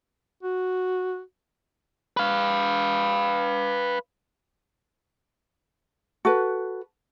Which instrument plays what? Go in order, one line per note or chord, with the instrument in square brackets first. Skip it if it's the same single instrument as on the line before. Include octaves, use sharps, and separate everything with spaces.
[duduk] F#4
[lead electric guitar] B4 F5
[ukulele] F#4 A4 B4